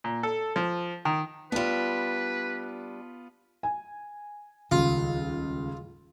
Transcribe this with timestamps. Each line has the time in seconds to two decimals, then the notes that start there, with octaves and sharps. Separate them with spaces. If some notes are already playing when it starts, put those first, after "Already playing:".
0.04 A#2
0.23 A4
0.56 F3
1.05 D#3
1.52 G3 B3 D4 F4 B4
3.63 G#5
4.71 D#1 C#2 F4